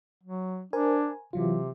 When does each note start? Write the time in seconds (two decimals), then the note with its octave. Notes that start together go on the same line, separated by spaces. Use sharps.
0.23 F#3
0.73 D4 A#4 C5 G#5
1.33 C3 E3 F#3 F4